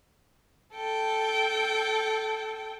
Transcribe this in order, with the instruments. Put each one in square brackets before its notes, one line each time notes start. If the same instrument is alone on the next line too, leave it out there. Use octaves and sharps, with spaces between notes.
[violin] A4 G5